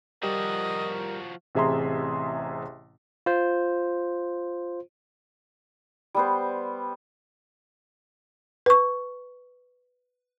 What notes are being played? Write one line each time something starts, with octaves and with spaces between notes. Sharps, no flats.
F3 G3 F#4 G4 A#4 D5 D#5
A1 C3 G#4 E5 A#5 C6
F4 C5
G3 B3 C5
B4 C#6